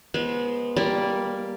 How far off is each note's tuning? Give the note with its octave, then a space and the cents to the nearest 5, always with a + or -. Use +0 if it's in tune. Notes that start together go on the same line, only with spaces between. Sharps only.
G#3 +0 B3 -30 C5 -10
G3 +0 A#3 +0 D5 +0